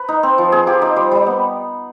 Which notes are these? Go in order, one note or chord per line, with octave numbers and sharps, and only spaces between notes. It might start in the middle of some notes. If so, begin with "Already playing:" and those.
Already playing: B4
D#4
C4
F3
C4 G#4
F3 G4
D#4 G4
G3 C5
G3
B3